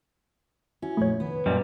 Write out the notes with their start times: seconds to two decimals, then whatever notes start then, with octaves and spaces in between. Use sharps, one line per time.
0.82 C#4 E4 F#4 E5
0.97 F2 A#2 F3 A3 C#5
1.20 C3 D#3 B3
1.46 F#2 A#2 G3 D#5